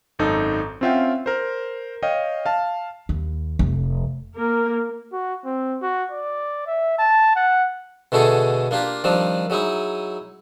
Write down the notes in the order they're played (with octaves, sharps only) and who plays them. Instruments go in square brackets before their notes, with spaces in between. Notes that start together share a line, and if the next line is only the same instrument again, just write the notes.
[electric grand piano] G#1 F#2 D#4 A4
C4 C#4 F4 E5 F#5 G5
A#4 C5
C#5 D#5 F5 G5
F5 A5
[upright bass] D#2
F1
[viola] A#3 A#4
[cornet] F#4
C4
F#4
D5
E5
A5
F#5
[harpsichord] B2 D3 A3 G#4 A4
A#3 D4 F4 G4
D#3 F3 G3 C4 D4
F#3 G#3 D#4 E4